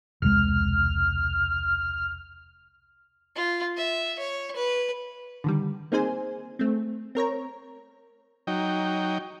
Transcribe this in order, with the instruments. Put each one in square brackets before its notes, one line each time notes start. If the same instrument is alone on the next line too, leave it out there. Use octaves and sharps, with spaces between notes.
[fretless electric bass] E1 C2 G#3 [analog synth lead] F6
[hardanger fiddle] F4
E5
C#5
B4
[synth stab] D3 D#3 G3
A#3 C4 D#4 G#4 C5 G#5
A3 C4
C4 A#4 C#5 A#5
[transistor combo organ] F#3 D#4 G5